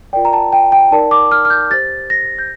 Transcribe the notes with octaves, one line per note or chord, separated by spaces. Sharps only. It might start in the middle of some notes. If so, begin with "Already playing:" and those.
F4 A#4 D5 G5
A#5
A5
G5
G5
D#4 A#4 D5 A5
D6
F6
F6
G6
G4 C5 A6
A#6
G6